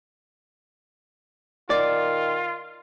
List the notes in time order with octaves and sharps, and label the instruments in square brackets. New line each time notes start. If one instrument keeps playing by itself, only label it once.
[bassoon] D#3 [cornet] F4 [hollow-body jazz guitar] D5